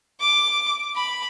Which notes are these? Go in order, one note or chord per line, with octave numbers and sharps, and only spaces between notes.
D6
B5